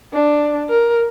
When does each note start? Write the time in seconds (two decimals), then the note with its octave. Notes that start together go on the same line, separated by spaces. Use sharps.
0.14 D4
0.69 A#4